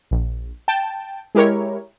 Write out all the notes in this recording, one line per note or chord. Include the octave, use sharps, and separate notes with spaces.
A#1
G5 A5
G#3 E4 G4 A#4 C#5